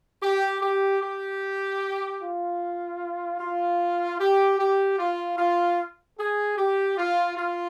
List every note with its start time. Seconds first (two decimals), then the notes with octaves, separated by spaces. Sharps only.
0.22 G4
0.62 G4
1.01 G4
2.21 F4
3.40 F4
4.19 G4
4.59 G4
4.99 F4
5.38 F4
6.18 G#4
6.57 G4
6.98 F4
7.37 F4